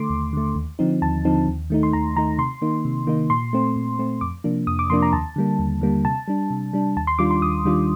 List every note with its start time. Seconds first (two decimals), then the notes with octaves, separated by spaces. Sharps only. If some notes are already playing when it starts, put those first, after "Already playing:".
Already playing: D3 A3 C6 D6
0.10 D#2
0.33 D3 A3
0.55 D#2
0.79 D3 F3 C4 D#4
1.02 D#2 A5
1.25 D3 F3 C4 D#4
1.48 D#2
1.70 D#3 A3 D#4
1.83 C6
1.93 D#2 A#5
2.16 D#3 A3 D#4 A#5
2.38 C3 C6
2.62 D#3 A#3 D#4
2.85 C3
3.07 D#3 A#3 D#4
3.30 A#2 C6
3.53 A3 C4
3.76 A#2
3.99 A3 C4
4.21 F2 D6
4.44 C3 F3 A#3 D4
4.67 F2 D#6
4.79 D6
4.90 C3 F3 A#3 D4 C6
5.02 A#5
5.13 D#2 A5
5.36 D3 G3 A#3
5.59 D#2
5.81 D3 G3 A#3
6.05 C3 A5
6.28 G3 D4
6.50 C3
6.73 G3 D4
6.96 D#2 A5
7.07 C6
7.19 D#3 G3 D4 F4 D6
7.31 C6
7.42 D#2 D#6
7.65 D#3 G3 D4 F4